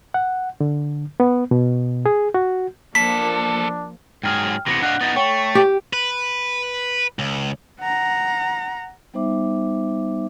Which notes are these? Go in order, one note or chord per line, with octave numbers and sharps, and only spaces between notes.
F#5
D3
B3
B2
G#4
F#4
E2 F3 A#3 D4 A4 B6
G#2 F#3 G#4 G5 F6
C3 E3 B3 A#6 C#7
D4 D#5 F5 F#5 F#6
B3 D#4 E4 F#5 A6
A3 C#5 G5 C#6
G4
B4
C#2
F#5 A#5
G3 B3 D#4 C5 E5 D6